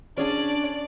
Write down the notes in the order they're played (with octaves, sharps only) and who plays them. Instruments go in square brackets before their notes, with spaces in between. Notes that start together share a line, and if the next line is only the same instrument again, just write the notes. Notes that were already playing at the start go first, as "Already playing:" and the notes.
[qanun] C#4 G#4 A5 [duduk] D4 [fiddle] D5